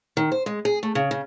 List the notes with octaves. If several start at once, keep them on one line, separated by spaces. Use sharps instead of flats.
D#3
C5
G#3
G#4
A3
C#3
C#3